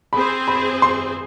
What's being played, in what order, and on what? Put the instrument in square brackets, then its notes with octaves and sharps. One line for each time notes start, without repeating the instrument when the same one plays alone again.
[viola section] C4 G#4 C5 [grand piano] B5
[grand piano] B5
C6